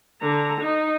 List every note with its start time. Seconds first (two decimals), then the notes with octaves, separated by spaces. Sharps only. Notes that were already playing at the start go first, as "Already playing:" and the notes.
0.21 D3 A#5
0.61 D#4